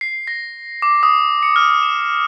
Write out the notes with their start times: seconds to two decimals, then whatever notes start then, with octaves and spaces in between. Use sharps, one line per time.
0.01 C7
0.27 A#6
0.82 D6
1.03 D#6
1.43 C#7
1.56 F6
1.83 E7